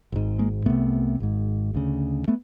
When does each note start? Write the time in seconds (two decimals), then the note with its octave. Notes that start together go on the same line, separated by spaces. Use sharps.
0.12 G#1 G#2
0.39 G#3 A#3
0.66 C2 C3 A3 B3
1.20 G#1 G#2
1.75 D2 C#3
2.28 A3 B3